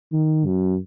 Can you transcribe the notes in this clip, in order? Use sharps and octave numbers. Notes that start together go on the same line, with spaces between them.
D#3
F#2